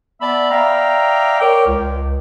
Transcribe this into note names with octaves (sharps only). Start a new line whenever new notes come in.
B3 D5 E5 A5 B5
D5 E5 F5 G5 A#5
A#4 C#5 D5 G5
C#2